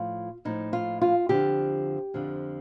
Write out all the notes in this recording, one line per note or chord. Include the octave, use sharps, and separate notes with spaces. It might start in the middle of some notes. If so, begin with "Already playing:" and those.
Already playing: A2 F3 F4
A2 F3 D#4
F4
F4
F2 D3 F3 G4
F2 D3 F3